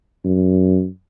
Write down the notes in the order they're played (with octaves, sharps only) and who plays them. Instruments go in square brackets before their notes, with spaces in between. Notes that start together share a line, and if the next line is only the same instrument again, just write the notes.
[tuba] F#2